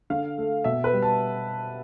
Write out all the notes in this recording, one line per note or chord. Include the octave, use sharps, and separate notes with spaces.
D3 F5
A3
B2 E5
B4
G3
A5